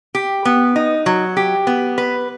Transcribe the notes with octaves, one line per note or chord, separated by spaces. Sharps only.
G4
B3
D#4
F#3
G4
B3
B4